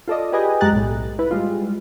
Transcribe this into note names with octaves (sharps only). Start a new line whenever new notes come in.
F4 A4 D5 D#5
G4 G#4 B4 D#5 G5 G#5
F#2 G#3 G4 A#5 F#6 A6
B1 A2
E4 B4
G3 G#3 F4